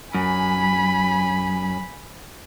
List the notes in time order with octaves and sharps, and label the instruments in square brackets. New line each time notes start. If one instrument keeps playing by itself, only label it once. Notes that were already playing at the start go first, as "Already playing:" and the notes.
[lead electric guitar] F#2 [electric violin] G#5 B5